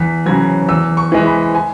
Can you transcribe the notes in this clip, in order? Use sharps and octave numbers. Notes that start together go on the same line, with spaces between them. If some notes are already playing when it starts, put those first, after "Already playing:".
Already playing: E2 B6
C#3 F#3 G#6
E2 E6
C#6
E3 G#3
B5
G#5